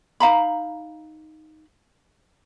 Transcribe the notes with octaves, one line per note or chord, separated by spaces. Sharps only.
D#4 F5 A#5 B5